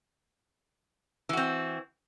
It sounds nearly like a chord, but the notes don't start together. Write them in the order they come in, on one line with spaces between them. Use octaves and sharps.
E3 F#4 C4